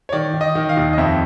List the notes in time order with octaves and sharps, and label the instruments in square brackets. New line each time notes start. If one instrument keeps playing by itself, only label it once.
[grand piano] C#5
D#3 D5
D#3
D#5
D#3
F5
D#2
D#5
F2 E5